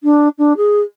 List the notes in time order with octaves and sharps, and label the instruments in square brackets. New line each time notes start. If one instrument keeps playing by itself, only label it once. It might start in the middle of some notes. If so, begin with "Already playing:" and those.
[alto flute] D4
D4
G#4